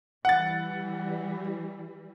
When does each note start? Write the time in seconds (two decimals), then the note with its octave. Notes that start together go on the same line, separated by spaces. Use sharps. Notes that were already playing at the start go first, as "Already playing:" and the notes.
0.25 E3 G3 F#5 A6